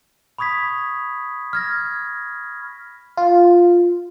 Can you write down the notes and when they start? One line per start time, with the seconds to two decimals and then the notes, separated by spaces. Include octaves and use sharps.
0.38 B5 C#6 D#6 G#6 B6
1.53 F6 G#6 A#6
3.17 F4